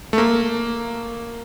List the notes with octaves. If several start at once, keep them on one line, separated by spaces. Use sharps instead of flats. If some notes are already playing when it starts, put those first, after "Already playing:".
A3
A#3